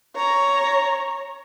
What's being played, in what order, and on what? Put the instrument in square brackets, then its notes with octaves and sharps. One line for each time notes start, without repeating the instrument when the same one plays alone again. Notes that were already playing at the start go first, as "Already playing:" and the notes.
[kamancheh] C#5 A#5